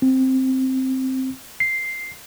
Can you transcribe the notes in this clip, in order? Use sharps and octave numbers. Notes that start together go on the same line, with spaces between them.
C4
C7